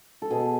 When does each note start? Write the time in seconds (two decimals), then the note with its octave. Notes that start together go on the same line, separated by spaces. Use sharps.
0.22 A4
0.31 B2 G#4